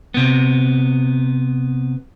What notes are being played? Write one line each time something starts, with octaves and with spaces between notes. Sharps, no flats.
C3 B3